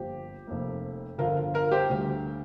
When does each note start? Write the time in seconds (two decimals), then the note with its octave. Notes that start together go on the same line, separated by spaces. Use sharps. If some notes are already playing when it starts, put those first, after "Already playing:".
Already playing: G1 F2 F3 A#3 G4 C5
0.47 F1 F2 F3 A#3
1.18 G1 F2 D3 F4 A#4
1.37 F4
1.54 F4 A#4
1.72 G4 C5
1.90 D2 D3 G3